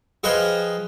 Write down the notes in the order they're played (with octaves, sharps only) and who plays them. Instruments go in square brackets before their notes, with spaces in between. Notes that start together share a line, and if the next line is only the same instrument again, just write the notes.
[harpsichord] F3 G#4 B4 D#5 F5 G5